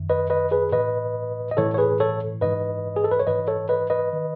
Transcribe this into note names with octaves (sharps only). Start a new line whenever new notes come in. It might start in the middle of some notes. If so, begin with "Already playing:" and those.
Already playing: F#2 D#3
B4 D#5
B4 D#5
G#4 B4
A2 E3 B4 D#5
D#5
A2 E3 A4 C#5
C#5
G#4 B4
A4 C#5
G#2 E3 B4 D#5
G#4
A4
B4
C#5
G#2 E3 B4 D#5
A4 C#5
B4 D#5
B4 D#5
D#3